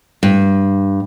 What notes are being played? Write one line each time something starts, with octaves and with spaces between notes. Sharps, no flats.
G2